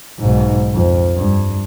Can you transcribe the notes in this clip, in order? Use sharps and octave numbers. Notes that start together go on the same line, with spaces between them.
B1 G#2
F2
G2